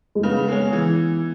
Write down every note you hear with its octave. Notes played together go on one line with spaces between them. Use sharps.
G#3
C#3 B3
G#3 C#4
E3